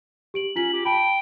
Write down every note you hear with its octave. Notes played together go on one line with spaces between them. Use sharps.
G4 D7 F#7
C#4 F4 B6 F#7
G4
G5 A5 B5